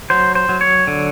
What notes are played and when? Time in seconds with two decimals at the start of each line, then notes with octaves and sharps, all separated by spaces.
0.10 F#3 C5
0.35 C5
0.49 F#3
0.61 C#5
0.87 D3